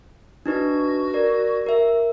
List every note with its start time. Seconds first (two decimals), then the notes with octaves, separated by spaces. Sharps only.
0.46 D4 D#4 F#4 B4
1.14 A#4 D5
1.66 A#4 E5